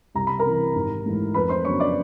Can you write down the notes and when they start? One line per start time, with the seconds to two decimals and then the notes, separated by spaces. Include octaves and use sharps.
0.15 C2 A#5
0.27 B5
0.39 A#4 A#5
0.46 C3 E3
0.75 G#1
1.06 G#2 E3 A3
1.34 F2 B4 B5
1.49 C5 C6
1.64 C#3 F#3 B3 D4 C#5 C#6
1.80 D5 D6